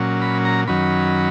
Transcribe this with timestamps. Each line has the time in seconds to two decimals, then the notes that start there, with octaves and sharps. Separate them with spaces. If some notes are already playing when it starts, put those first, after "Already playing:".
Already playing: A#2 F#3 C#4
0.22 B5
0.45 A#5
0.67 F#2 D#3 F#3 C#4 B5